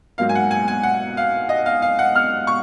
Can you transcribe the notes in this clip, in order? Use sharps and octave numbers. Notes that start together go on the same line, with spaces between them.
G#2 F#3 A#3 F5
G#5
F#5
G#5
G#5
F#5
F5
D#5
F5
F5
F#5
F6
C#6